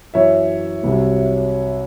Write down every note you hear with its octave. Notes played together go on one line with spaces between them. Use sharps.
F#2 E3 C#5 E5
C2 C3 F#3